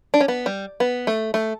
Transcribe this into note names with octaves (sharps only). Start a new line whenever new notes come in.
D4
C#4
B3
G3
B3
A3
A3